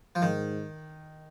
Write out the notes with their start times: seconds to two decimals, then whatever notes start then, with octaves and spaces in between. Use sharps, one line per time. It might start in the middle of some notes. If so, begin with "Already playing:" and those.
0.15 F3
0.22 G#2 D#3